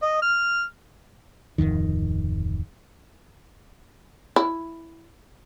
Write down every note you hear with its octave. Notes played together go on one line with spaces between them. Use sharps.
D#5
F6
D1 G#1 F2 D#3
E4